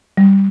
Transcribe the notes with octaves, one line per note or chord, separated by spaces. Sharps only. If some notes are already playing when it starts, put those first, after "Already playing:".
G3